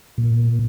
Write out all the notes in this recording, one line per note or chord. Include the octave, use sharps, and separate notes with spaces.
A#2